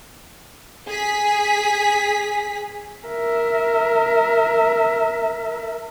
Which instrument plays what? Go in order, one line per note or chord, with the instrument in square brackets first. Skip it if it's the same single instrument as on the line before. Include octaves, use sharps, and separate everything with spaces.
[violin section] G#4 B6
[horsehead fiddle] A#4 E5